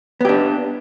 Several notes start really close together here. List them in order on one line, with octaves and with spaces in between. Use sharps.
B3 G4 D4